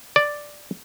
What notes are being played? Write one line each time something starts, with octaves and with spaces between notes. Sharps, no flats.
D5